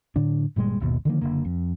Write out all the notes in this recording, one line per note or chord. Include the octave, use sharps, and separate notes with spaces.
A2 D3 D4
G1 A#2 G3 G#3
D#1 G#1 D#2 B2
D3 D#3 F3 A#3
F#1 C2 D3 A#3
F2